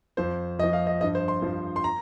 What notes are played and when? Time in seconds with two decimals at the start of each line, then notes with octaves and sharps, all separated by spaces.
0.17 F2 F3 C5
0.59 F2 D#5
0.63 F3
0.73 F5
0.87 D#5
1.01 G2 F3 D#5
1.15 C5
1.28 C6
1.42 G2 F3
1.76 C6
1.84 A#5